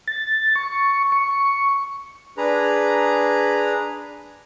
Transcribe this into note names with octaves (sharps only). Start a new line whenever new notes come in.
A6
C#6
C#6
D4 G#4 B4 A#5